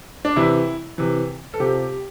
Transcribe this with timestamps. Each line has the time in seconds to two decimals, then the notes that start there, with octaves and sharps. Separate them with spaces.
0.25 D4
0.36 C3 E3 E4
0.98 C3 E3
1.54 A4
1.60 C3 F3 G4